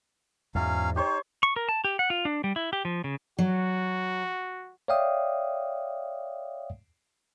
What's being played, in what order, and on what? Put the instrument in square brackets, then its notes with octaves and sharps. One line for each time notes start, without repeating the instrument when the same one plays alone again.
[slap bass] E2 G#2 [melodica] F#3 C#4 F5
[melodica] D#4 [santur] G4 C5 C#5
[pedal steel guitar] C#6
A#4
A5
G4
F#5
F4
D4
G3
E4
G4
F3
C#3
[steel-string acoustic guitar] F#3 [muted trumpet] F#4
[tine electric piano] C#5 D5 E5 F5 G5 D#6